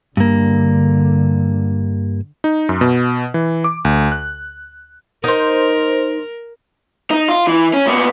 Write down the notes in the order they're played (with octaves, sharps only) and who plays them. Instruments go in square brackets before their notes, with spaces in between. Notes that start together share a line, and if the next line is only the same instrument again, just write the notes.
[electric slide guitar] G2 A#3 [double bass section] D3
[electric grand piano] D#4
F#2
B2
E3
D6
D2
F#6
[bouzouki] D#4 C5 [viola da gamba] A#4
[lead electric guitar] D#4
F4
E3
C#4
A#2 B3